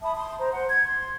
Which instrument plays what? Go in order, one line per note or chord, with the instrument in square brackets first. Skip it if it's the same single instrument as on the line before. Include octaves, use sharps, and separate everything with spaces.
[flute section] E5 A5 B5 D#6
A5 C6 D#6
C5 A#5
C5 F#5 C6
G#6
C6